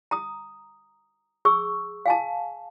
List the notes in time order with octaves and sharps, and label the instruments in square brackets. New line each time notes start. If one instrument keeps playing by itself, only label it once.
[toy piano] A#5 D#6
G#4 C#6 E6
F5 G#5 A5